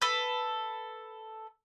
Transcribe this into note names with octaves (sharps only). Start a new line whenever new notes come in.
A4 B4